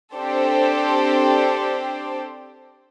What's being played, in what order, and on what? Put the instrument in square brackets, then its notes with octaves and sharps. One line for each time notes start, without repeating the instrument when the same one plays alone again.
[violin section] C4 D4 G4 A4 C5